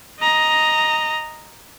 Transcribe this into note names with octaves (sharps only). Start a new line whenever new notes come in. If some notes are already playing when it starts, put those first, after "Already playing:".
D#5 A#5